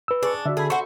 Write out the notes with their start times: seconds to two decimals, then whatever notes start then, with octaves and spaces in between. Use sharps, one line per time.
0.08 B4 E6
0.23 D4 G#4 C#6
0.46 D3 F#4 D5 E5
0.57 G#4 A4 B5
0.70 F#4 C5 C#6